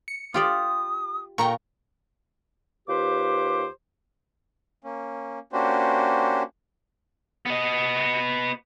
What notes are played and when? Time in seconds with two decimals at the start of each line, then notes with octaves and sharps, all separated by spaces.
0.08 C#7
0.34 F4 G4 D5 D#6
1.38 A#2 G5 A#5 C#6
2.88 D#2 F4 G4 B4 C5 D6
4.84 A#3 C#4
5.53 A#3 C#4 D4 F#4 G4 C5
7.46 B3 D#5